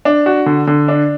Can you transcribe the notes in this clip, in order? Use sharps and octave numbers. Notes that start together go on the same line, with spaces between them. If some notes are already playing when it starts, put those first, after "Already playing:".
D4
F#4
D3
D3
D4